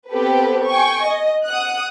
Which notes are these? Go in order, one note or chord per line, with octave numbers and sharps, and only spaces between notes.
B3 C4 G4 A4 B4
G5 G#5 C#6
D#5
F#5 D#6 F#6